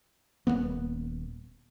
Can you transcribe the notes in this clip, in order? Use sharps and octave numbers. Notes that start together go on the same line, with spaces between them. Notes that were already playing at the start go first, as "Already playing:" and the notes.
D#1 F#2 A#3 B3